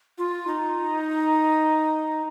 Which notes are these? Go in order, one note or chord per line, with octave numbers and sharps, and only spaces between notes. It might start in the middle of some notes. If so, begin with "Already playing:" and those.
F4
D#4